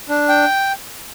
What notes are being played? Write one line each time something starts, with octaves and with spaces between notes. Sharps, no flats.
D4
G5